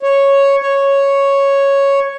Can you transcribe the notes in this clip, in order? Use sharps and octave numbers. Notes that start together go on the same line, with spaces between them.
C#5
C#5